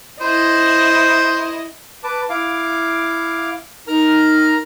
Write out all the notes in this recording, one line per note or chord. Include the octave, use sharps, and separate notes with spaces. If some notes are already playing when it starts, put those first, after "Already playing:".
E4 C5 D#5
B4 A5 D6
E4 F5 D6
D#4 A#4 A#5 F6